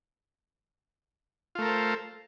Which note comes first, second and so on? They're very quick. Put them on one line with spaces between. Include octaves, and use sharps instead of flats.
F4 A3 A#4 A4 C5